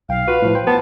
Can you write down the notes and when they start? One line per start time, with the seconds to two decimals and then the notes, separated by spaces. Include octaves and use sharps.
0.09 B1 F5 G5
0.28 F4 F#4 B4
0.42 A2 F3
0.55 C5 G5
0.67 B3 A5